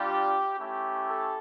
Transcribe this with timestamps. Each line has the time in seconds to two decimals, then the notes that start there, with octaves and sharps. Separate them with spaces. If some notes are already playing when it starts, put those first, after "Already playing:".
Already playing: G3 D4 F4 G4
0.59 A3 C#4 E4 G4
1.09 A4